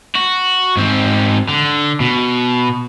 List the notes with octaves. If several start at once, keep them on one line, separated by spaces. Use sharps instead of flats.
F#4
G#2 C4
D3
B2